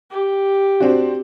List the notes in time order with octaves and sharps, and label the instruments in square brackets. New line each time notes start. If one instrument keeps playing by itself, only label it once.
[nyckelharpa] G4
[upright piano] C4 D4 F#4